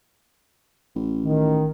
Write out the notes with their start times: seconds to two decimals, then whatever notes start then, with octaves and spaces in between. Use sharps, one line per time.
0.96 A1
1.24 D#3